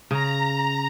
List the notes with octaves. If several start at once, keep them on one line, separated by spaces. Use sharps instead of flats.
C#3 A#5